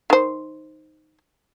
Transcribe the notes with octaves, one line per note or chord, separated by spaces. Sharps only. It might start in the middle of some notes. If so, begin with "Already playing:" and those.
D#3 C5